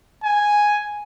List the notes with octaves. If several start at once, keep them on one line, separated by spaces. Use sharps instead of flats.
G#5